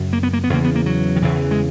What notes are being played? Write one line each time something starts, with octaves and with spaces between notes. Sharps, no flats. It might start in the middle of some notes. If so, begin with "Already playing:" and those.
Already playing: F#2 C#3
A#3
B3
A#3
B3
E2 C#3 A#3
B3
A#3
F#3
D#3
E2 C#3 E3
G#3